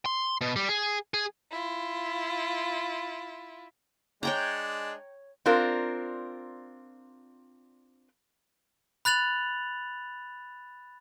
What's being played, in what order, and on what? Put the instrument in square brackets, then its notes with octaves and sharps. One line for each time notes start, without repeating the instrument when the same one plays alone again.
[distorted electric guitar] C6
B2
G3
G#4
G#4
[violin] E4 F4
[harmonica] G#3 D4 [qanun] C#5 G5 A#5
[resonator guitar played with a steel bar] C4 D4 F4 A#4
[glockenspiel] B5 F#6 A6 F7 F#7